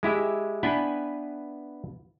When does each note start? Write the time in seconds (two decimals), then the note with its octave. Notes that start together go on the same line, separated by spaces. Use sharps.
0.03 G#3 E4 G4 E5
0.63 B3 D4 E4 B4 G5 G#5